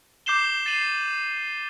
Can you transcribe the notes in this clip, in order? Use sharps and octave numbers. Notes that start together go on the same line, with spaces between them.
D6 G6 C7 E7 G7
A6 C7 D#7 F#7